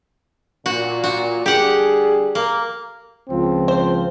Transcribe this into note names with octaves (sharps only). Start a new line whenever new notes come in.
A#2 F#4
F#4
D3 G3 G4 G#4 F#5
A#3
C#2 F3 C4
C5